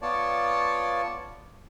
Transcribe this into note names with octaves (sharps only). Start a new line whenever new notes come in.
B3 F4 C#5 D5 A5